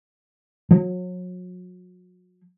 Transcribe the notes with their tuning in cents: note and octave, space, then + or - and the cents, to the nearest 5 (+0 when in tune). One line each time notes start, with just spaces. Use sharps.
F#3 -35